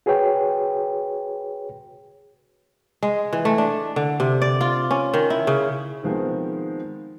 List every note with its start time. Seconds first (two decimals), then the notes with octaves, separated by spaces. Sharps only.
0.06 F#4 G#4 B4 C#5 G5
3.03 G#3
3.33 E3
3.45 A3
3.58 D4
3.96 D3
4.20 C3
4.42 D5
4.61 F4
4.91 C#4
5.14 D#3
5.30 E4
5.47 C#3
6.03 D#3 F3 G#3 B3 C4